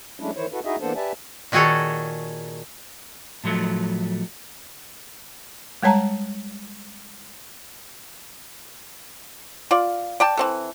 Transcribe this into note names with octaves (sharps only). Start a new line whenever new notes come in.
F#3 G#3 A3 C#4 D4 E4
D#3 E3 E4 C5 C#5
E4 F#4 A4 B4
D#4 E4 F#4 G#4 D#5 E5
E3 A#3 B3 D4 A4 C5
G4 B4 D5 E5 G#5 A5
A#2 D#3 F#4 G#4 A4 C#5
A2 F3 F#3 A3
G3 G#3 C#5 A5 A#5
F4 D5
D5 G5 A5
E3 C4 A4